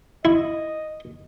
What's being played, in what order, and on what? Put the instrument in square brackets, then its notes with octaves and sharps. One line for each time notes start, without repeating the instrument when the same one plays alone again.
[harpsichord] E4 [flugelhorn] D#5